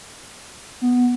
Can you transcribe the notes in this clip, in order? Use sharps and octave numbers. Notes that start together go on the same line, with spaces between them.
B3